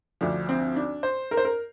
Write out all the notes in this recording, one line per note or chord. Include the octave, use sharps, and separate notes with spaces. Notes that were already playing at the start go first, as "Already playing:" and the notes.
D2 D3 F3 D4
C4
D4
C5
A#4
C5
A#4